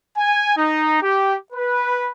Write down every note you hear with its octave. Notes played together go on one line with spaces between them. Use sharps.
G#5
D#4
G4
B4